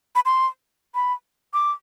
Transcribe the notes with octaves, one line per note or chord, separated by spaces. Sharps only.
B5
C6
B5
D6